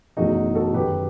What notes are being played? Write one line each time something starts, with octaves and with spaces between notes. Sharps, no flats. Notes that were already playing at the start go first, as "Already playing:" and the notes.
F#1 E2 B2 A3 D#4 F#4
F#4 A4
F#1 F#2 D#3 G4 B4